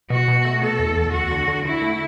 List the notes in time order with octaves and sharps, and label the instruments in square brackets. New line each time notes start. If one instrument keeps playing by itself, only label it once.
[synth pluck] B2 [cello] F#4
[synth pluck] B2
A3
[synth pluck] B2 [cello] A4
[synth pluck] E2
E2
[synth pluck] D2 [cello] F#4
[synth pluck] D3
D3
[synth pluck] D3 [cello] E4
[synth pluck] A3